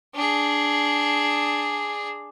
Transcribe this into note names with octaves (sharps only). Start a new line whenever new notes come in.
D4 G#4